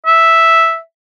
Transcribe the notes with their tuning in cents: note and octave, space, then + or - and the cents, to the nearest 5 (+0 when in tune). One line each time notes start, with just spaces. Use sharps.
E5 -5